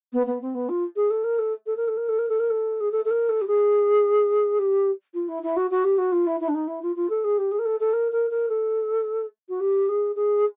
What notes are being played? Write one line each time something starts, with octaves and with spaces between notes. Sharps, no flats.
B3
B3
C4
B3
F4
G#4
A4
A#4
A4
A4
A#4
A4
A#4
A4
A#4
A4
A#4
A4
G#4
A4
A4
A#4
A4
G4
G#4
G4
F4
E4
E4
F#4
F#4
G4
F#4
F4
E4
E4
D4
D#4
E4
F4
F4
A4
G#4
G4
G#4
A#4
A4
A4
A#4
A#4
A#4
A4
F#4
G4
G#4
G#4